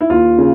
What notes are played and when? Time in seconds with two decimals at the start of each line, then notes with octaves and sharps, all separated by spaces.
0.01 E4
0.09 D#2 F4
0.38 C#3